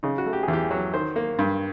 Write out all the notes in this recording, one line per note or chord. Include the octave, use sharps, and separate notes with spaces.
C#3 D#4
F#4
A3
G4
G#4
E2
G4
F#3
D#3 C5
A#3
G2